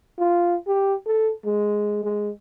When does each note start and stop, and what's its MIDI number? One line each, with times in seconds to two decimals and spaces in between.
0.19 0.56 65
0.67 0.95 67
1.06 1.32 69
1.45 2.02 56
2.04 2.31 56